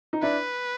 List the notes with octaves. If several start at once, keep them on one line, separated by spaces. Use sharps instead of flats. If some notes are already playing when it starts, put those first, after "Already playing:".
D#4
D4 E4 B4